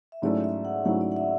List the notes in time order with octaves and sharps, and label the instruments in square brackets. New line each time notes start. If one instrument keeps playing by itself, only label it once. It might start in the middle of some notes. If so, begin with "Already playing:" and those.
[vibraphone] E5
[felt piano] G#2 F#3 A3 C#4 E4 [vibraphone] D5
[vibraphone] E5
F#5
[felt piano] G#2 F#3 A3 C#4 E4 [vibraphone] F#5
[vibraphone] D5
F#5
E5